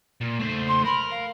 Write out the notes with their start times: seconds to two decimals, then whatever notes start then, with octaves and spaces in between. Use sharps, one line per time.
0.21 A#2
0.39 A3 C5
0.68 C6
0.85 A#4 B5
1.11 F5